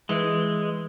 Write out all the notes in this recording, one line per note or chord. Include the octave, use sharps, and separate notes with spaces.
E3 G#3